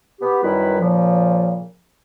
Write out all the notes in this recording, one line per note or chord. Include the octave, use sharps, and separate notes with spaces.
B3 G4
F#2 D#3 G3 E4 B4
A#2 C#3 F3